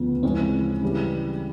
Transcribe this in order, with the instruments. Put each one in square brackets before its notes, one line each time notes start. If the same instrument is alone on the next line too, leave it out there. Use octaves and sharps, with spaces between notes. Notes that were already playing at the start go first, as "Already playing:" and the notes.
Already playing: [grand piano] D2 C#3 F3 [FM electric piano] B3
[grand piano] F2 C#3 E3 G#3 C#4 [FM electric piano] C4
[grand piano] C#3 E3 G3